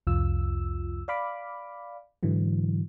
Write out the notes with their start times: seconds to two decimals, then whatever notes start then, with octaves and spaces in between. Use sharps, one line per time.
0.07 C2 F2 F4 E6
1.08 D5 F5 B5 D6
2.23 G#2 D3 E3 F#3